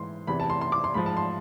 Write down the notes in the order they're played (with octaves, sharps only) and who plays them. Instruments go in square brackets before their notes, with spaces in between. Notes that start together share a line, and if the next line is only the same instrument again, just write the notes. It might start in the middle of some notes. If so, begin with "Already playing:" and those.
Already playing: [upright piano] G#2 E3 C6
E2 C3 E3 B5
A5
C6
C6
D6
C6
G#2 F3 B5
A5
C6